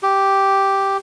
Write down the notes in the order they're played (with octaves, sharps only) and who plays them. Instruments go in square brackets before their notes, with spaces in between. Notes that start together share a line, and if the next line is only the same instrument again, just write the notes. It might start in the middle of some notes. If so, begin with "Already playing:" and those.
[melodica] G4